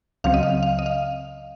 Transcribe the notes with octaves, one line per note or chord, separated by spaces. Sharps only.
C#2 C#3 F#3 C4 F5
D#5
F5
F5
D#5
F5